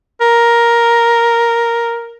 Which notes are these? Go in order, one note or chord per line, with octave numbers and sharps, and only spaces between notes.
A#4